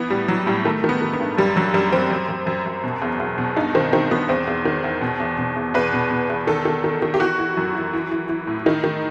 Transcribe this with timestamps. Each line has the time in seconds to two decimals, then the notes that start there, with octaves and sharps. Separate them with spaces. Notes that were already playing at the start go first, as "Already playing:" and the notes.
Already playing: E3 B3
0.11 A2 G3
0.28 E3 F#3
0.46 A2 G3
0.65 D#3 A3
0.84 D#3
0.89 B3
1.02 D#3
1.13 B3
1.20 G2
1.38 F#2 G3
1.56 F#2 F#3
1.74 F#2 G3
1.92 F#2 C4
2.10 F#2
2.29 F#2
2.47 F#2
2.66 F#2
2.84 B2
3.02 E2
3.20 E2
3.38 B2
3.57 G2 D#4
3.75 D#3 C4
3.93 D#3 C4
4.11 D#3 B3
4.29 E2 C4
4.47 E2
4.65 D#3
4.84 E2
5.02 B2
5.20 E2
5.39 B2
5.56 E2
5.74 E2 B4
5.93 B2
6.11 B2
6.30 E2
6.47 D#3 A4
6.65 D#3
6.84 D#3
7.02 D#3
7.14 G4
7.20 E3 F#4
7.39 E3
7.57 F#2
7.75 E3
7.93 E3
8.11 E3
8.29 E3
8.47 A2
8.66 D#3 D#4
8.84 D#3